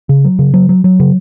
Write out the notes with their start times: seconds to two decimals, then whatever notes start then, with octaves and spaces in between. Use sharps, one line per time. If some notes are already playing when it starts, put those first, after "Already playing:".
0.09 C#3
0.25 F#3
0.39 C#3
0.54 F#3
0.69 F#3
0.84 F#3
1.00 C#3